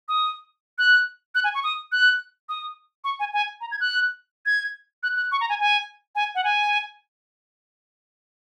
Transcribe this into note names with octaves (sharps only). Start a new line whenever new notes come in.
D#6
F#6
F#6
G#5
C#6
D#6
F#6
D#6
C#6
G#5
G#5
A#5
G#6
F#6
G#6
F#6
F#6
C#6
A#5
G#5
G#5
G#5
F#5
G#5